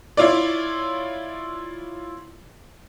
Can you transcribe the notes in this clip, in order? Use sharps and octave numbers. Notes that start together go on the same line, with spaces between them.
E4 F4 C#5 D5